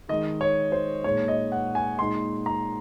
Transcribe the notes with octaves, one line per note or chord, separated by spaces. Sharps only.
D#3 G#3 D#4 D#5
C#5
C5
A#2 G#3 D#4 C#5
D#5
F#5
G#5
A#2 G#3 D#4 C6
A#5